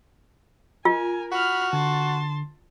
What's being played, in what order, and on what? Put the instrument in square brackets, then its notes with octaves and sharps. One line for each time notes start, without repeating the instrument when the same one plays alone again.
[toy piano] F4 [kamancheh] A#4 G#5
[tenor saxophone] F#4 [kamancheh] B5 F6
[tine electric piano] D3 [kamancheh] A5 C6